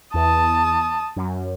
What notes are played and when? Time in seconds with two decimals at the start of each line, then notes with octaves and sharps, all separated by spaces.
0.14 E2 A5 D#6
1.16 F#2